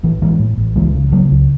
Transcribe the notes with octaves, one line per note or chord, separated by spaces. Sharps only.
A1 E3
A2 E3 G#3
A2
A1
C#2 E3 G#3
C#3
C#3 F#3 A3
C#2